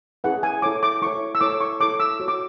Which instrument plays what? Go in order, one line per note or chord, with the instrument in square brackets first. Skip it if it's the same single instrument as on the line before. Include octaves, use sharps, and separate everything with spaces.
[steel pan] C#4 E4 G#4 B4 F#5
G#5
E4 A4 C#5 D6
D6
E4 A4 C#5 C#6
E6
E4 A4 C#5 D6
C#6
E4 A4 C#5 D6
E6
F#4 C#5
D6